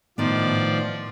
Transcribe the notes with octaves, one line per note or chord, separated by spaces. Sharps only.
A2 D#3 F3 B3 D5